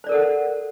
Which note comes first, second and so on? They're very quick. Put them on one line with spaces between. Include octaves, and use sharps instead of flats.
C5 D5 A#4 A4 F#5